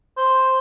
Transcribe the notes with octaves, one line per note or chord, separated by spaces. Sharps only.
C5